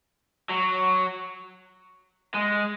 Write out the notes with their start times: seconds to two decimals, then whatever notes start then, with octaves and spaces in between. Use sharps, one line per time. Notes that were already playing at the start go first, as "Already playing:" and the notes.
0.50 F#3
2.34 G#3